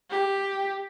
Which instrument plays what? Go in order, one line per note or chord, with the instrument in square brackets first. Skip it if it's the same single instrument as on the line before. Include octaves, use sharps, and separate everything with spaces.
[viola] G4